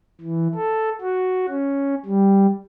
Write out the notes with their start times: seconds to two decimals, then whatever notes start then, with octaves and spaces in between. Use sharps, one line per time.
0.21 E3
0.55 A4
1.02 F#4
1.49 C#4
2.06 G3